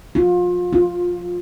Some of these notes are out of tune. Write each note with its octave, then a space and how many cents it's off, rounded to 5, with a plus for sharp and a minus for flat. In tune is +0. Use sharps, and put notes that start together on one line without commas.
F4 +30
F4 +10